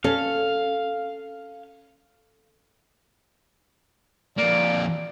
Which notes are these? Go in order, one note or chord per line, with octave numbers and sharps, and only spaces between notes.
C#4 A4 F5
F2 A#3 D5